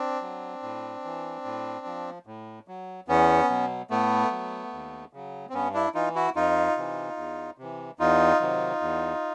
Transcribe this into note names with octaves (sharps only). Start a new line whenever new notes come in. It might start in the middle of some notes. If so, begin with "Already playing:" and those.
Already playing: C4 D4
F#3
A2
E3
A2
F3
A2
F#3
E2 B3 C#4
B2 F#3
A2 A3 B3
F#3
D#2
C#3 F#3
C4
G2 B3 C#4
D4 E4
E3 D#4 F4
E4 F#4
F2 D#4 F4
C3 E3
E2
C3 E3
E2 D#4 F4
C3 D#3 F#3
E2